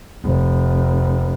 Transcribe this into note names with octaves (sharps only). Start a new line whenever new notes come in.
F1